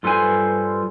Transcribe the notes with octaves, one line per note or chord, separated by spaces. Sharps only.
G2 F4 A4 B4 C5 G#5